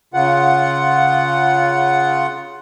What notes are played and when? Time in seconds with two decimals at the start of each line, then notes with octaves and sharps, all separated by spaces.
0.14 C#3 F4 F#5